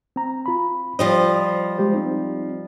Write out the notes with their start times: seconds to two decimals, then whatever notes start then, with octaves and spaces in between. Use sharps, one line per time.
0.16 C4 A#5
0.46 F4 B5
0.99 F3 G3 C5 D#5
1.78 G#3 G4 C5
1.94 C4 D#4